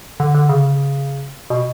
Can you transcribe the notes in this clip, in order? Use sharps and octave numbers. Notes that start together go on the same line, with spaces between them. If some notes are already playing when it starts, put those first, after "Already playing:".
D3
D3
C#3
B2